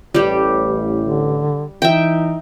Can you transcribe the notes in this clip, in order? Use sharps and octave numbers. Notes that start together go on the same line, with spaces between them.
A1 G3 G4
D3
E3 D#4 E5 G5